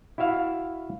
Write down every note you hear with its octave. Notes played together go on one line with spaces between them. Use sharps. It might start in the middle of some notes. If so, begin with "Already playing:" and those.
E4 F#4 E5 F5